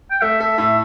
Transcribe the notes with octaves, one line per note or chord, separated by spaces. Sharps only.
G5
A3 E5
A4 E5
A2 E5